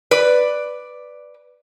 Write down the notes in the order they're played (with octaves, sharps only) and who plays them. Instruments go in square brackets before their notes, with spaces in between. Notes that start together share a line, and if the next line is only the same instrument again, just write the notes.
[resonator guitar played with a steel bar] B4 D5